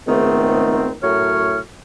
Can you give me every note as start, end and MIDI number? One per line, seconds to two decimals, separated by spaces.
0.07 0.93 37
0.07 0.93 44
0.07 0.93 51
0.07 0.93 57
0.07 0.93 59
0.07 0.93 60
1.02 1.59 42
1.02 1.59 45
1.02 1.59 54
1.02 1.59 57
1.02 1.59 73
1.02 1.59 89